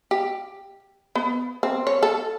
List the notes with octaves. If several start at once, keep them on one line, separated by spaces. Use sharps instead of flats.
G4
B3
C4
C#5
A4